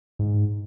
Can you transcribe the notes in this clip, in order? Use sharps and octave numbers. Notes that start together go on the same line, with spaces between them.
G#2